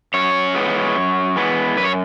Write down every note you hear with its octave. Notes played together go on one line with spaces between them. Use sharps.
F#2 C#5
E3 G#3 B3
F#2
E3 G#3 B3
F#2 B4
C#5